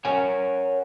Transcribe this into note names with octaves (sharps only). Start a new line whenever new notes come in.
A#4 C#5 F#5 G#5